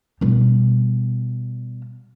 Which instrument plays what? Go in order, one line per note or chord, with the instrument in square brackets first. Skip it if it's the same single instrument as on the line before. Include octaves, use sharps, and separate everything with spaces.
[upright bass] B2 G3